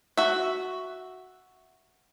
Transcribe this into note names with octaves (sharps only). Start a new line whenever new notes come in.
F#4 E5